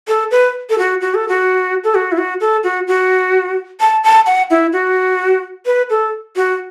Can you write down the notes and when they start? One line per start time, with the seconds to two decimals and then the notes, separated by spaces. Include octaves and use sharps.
0.08 A4
0.31 B4
0.70 A4
0.78 F#4
1.01 F#4
1.15 A4
1.28 F#4
1.84 A4
1.95 F#4
2.12 E4
2.18 F#4
2.41 A4
2.64 F#4
2.88 F#4
3.80 A5
4.04 A5
4.26 F#5
4.51 E4
4.73 F#4
5.66 B4
5.90 A4
6.36 F#4